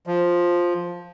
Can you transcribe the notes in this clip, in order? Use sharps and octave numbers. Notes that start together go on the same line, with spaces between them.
F3